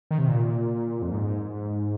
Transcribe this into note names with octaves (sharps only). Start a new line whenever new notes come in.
D#3
C3
A#2
F2
G#2